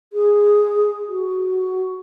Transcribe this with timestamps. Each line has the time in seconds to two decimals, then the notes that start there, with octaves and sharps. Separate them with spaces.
0.13 G#4
1.08 F#4